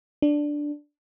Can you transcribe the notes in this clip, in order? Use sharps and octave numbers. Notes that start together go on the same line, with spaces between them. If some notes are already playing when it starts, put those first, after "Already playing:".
D4